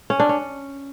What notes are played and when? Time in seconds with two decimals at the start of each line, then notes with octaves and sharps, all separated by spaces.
0.10 C#4
0.20 D4
0.29 C#4